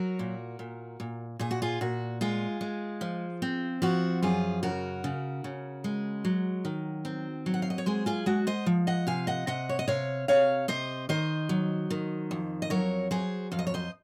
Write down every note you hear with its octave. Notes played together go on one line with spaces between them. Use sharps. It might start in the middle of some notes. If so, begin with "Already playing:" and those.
Already playing: F#3 F#4 A#4
A#2
A#2
A#2
A#2 G#4
F#4
F4 G#4
A#2 F#4
G#3 F4 G#4
G#3
F3
C4
F3 F#4
F#2 F4 G#4
C#3 F#4 A#4
C#3
C#3
G#3
F#3
D#3
C4
F#3
F#5
F5
D#5
C#5
G#3 G#4 C5
F4 G#4
G#3 F#4
C5 D#5
F3
D#5 F#5
C3 F5 G#5
D#5 F#5
C3 D#5 F#5
C#5
D#5
C3 C#5 F5
C3 C#5 F5
C3 C5 D#5
D#3 C5 D#5
F#3
D#3
F2
D#5
F#3 A#4 C#5
F#3 G#4 C5
F2 F5
D#5
C#5
C5 D#5